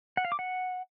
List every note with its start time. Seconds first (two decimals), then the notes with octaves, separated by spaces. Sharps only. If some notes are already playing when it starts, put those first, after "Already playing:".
0.17 F#5
0.25 F5
0.32 D6
0.39 F#5